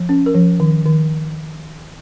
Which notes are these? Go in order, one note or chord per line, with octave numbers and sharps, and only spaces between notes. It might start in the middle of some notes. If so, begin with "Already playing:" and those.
Already playing: F3
C#4
A#4
F3
D#3
D#3